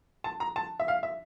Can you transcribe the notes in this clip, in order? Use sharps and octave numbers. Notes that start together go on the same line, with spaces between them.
A5
A#5
A5
E5
F5
E5